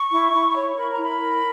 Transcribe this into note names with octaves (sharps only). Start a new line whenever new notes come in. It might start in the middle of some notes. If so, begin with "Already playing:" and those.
Already playing: C#6
E4
E4
C#5
A#4 B5
A#5
E4 B5
A#4